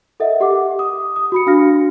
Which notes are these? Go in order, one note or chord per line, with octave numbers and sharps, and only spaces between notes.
A4 A#4 D#5 E5 F#5
G4 F#5 D6
D#6
D#6
F#4 B5 C#7
D4 F#4 F5 F6 A#6